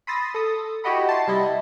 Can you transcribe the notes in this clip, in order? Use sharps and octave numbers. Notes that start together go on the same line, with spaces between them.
B5 C6 D#6 E6 A6 A#6
A4 D#6
E4 F#4 G4 D#5 F#5 B5
A5 C6
C3 G3 E4 D#5